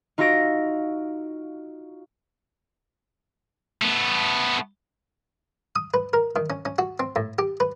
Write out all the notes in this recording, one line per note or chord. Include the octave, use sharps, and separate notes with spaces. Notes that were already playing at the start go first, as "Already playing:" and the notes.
D#4 F4 F#4 E6 A#6 D7
A3 B3
D#6
B4
A#4
D#3
C#4
C#4
F#4
C4
A2
G4
B4